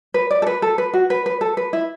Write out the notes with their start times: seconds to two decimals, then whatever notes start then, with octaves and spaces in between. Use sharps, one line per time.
0.14 B4
0.31 D5
0.42 A4
0.47 B4
0.62 A4
0.78 B4
0.94 F#4
1.10 B4
1.26 B4
1.41 A4
1.57 B4
1.73 E4